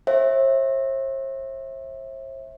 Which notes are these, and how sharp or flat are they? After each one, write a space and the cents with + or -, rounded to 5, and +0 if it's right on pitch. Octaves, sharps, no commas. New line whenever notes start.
C5 +45 E5 -10